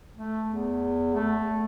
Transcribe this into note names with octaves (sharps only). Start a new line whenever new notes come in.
A3
E2
A3